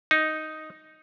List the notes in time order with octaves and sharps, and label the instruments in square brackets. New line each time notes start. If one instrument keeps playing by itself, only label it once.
[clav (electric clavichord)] D#4